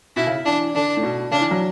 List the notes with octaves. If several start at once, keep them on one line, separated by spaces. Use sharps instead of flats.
B2 E4
C#3
E3 D4
D3 D4
A2
B2
C#3 D4
E3
F#3